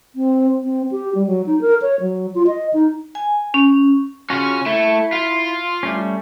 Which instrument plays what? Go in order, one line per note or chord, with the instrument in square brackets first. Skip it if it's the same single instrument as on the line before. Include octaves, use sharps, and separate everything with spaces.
[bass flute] C4
C4
G4
G3
F#3
D#4
A#4
C#5
F#3
F4
D#5
D#4
[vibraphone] G#5
C#4
[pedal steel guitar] C#3 F4 F#4 [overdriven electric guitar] C#4 C#5
[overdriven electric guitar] A3 [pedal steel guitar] E4
[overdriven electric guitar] F4
[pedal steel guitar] G3 A3 C#4